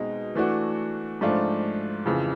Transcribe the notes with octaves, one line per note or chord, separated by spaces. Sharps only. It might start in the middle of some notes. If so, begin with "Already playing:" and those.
Already playing: B2 G#3 C4 D#4
E3 A3 D4 F#4
G#2 F3 A3 D4 F4
F2 C#3 E3